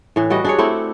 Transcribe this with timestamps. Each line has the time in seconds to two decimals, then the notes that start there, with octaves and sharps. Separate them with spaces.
0.16 A2 E3
0.30 G3 F#4 D#5
0.45 D4 G#4 C#5
0.59 A3 C4 E4